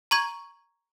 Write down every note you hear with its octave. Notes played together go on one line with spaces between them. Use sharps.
A#5 C#6 G#6